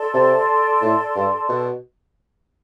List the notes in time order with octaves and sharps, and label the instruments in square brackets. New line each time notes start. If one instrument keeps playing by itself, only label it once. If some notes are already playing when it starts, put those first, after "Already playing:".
Already playing: [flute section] A4 D5 A5 C6
[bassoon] C3
A2
G2
B2